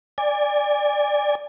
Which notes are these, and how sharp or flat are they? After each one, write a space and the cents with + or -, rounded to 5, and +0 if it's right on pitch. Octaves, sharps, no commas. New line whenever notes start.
D5 +0 G#5 -25